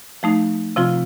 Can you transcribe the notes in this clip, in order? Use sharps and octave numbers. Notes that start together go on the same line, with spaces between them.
F3 A3 D#4
C3 F3 C4 F4